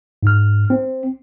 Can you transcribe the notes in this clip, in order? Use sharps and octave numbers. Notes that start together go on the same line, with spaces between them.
G#2 F6
C4